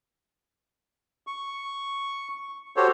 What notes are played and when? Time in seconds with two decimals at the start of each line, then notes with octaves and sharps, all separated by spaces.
1.27 C#6
2.77 F#4 G4 A4 C5 C#5